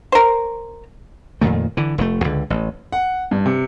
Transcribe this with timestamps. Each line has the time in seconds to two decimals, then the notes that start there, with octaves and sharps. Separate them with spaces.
0.12 A#4 C5
1.41 F2 A#2 D#3 A3
1.77 D3 E3
1.98 F1 B2 A3
2.24 C#2 D3
2.50 A1
2.92 F#5
3.31 G2
3.46 C3